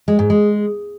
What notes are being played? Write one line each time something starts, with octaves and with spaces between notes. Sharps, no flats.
G#3
G#2
G#3